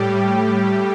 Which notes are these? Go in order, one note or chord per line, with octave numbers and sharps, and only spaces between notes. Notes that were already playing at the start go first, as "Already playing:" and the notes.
Already playing: A2 G3 G4